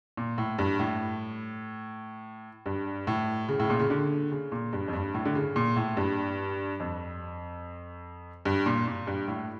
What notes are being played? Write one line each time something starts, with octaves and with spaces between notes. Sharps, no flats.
A#2
A2
G2
A2
G2
A2
C#3
A2
A#2
C#3
D3
C#3
A#2
G2
F2
G2
A2
D3
C#3
A#2
A2
G2
F2
G2
A#2
A#2
G2
A2